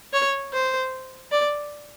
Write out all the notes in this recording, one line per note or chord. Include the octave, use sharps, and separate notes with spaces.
C#5
C5
D5